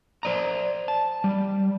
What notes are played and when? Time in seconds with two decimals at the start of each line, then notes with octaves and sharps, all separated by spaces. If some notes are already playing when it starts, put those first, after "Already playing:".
0.23 C5 D5 A#5
0.88 A5
1.24 G3